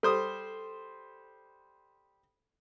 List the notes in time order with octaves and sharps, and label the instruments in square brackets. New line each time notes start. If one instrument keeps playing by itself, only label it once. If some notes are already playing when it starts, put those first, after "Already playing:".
[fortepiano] G3 C5 D#6 [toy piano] A4